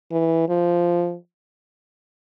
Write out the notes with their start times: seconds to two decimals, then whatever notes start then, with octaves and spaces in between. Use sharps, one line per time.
0.12 E3
0.49 F3